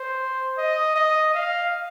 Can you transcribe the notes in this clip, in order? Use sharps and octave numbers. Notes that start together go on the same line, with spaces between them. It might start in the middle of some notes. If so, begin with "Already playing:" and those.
Already playing: C5
D#5
D#5
F5